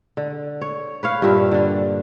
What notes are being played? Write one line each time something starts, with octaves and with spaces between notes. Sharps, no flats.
D3
C#5
B4 C#5 F5
G2 A#2 G4 E5
D3 D4